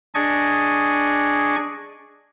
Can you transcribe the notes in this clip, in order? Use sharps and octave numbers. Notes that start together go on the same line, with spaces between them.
D4 G#4 D5 D#5 G#5 C#6